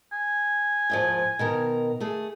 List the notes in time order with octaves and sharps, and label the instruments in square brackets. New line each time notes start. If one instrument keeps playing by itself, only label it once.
[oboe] G#5
[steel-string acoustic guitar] D#2 G#2 F3
B2 D#3 A#4
A3 G#4